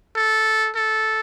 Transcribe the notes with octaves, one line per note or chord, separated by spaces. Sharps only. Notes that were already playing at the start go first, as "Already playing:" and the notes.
A4
A4